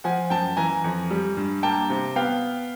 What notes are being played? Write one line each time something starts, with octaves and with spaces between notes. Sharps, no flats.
F3 F#5 G#5
F#2 G5 A5
E3 G#5 A#5
F2
G3
G2
A#3 G5 A5
C3
B3 F5 G5